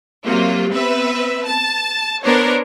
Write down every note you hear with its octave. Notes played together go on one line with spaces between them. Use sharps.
C3 F#3 A#3 F4
B3 C4 B4 E5
A5
B3 D4 A#4 C5 C#5